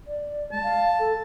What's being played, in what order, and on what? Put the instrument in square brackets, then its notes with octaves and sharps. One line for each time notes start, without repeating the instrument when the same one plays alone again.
[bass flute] D5
[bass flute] G#3 [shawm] A5
[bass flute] F5
A4